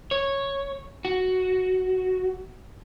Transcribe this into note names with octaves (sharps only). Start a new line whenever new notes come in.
C#5
F#4